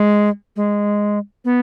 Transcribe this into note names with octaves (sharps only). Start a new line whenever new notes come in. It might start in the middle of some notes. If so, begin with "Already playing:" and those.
Already playing: G#3
G#3
B3